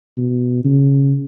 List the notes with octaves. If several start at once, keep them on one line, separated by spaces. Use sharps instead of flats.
B2
C#3